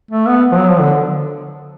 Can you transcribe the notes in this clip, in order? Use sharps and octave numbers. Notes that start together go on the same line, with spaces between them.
A3
B3
F3
F#3
F3
D3